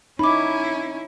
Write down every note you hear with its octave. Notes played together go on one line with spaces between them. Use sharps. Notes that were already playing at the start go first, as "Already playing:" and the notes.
C#4 D#4 E4 B5 D6